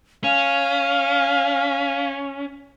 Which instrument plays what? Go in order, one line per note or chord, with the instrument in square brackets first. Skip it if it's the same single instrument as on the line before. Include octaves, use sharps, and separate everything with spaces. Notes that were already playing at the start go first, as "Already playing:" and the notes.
[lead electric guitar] C#4 [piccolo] F5